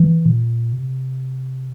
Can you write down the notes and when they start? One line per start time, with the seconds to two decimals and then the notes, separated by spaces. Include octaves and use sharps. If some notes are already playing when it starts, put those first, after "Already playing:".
Already playing: E3
0.26 A#2
0.73 C3